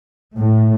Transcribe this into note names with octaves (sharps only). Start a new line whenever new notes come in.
A2